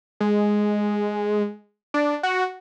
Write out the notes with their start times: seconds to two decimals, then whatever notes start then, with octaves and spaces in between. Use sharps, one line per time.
0.20 G#3
1.94 D4
2.23 F#4